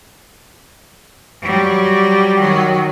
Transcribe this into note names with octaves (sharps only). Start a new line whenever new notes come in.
F#3 G3
D#3 F#3